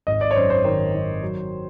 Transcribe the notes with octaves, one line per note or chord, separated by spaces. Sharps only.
G#1 D#5
D5
C#5
F#2 C5
C5
D#3 C5
D#3
F#3